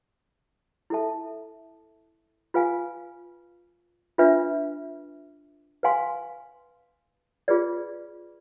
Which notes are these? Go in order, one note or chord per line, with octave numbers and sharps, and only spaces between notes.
E4 A4 E5 A5
F4 B4 F5 G#5
D4 F4 B4 E5
B4 F5 G#5 C6
F4 G#4 B4 D5